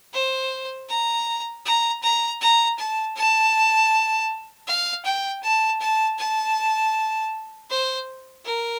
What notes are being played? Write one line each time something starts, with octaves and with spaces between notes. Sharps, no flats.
C5
A#5
A#5
A#5
A#5
A5
A5
F5
G5
A5
A5
A5
C5
A#4